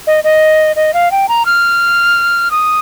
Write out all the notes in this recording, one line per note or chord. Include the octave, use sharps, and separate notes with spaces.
D#5
D#5
D#5
F5
G5
A#5
F6
D#6